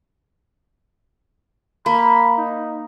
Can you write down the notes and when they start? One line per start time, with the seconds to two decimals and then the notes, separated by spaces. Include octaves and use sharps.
1.86 A#3 B5
2.38 D#4